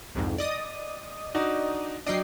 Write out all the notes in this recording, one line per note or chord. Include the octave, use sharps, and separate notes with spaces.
C2 F2 G#2
D5 D#5 D#6
D4 D#4 F#4
F#3 D4 D#5 G5 C7